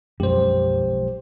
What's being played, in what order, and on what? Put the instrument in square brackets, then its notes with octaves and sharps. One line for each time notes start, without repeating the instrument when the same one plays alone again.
[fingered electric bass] B1 F3 G#3 [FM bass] F#2 [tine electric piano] G4 C5